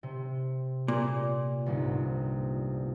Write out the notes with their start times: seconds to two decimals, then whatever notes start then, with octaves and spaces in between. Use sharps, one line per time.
0.03 C3
0.88 A#2
1.66 G1 C2 G#2